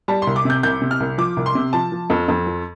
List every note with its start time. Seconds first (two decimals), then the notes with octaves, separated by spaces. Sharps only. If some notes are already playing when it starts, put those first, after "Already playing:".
0.08 G3 A5
0.22 C2 C6
0.36 D6
0.45 C3 G6
0.63 C2 G6
0.82 C3
0.91 F6
1.00 C2
1.18 F3 D6
1.37 C2
1.46 C6
1.55 C3
1.73 F3 A5
1.92 F3
2.10 F2
2.28 F2
2.47 F3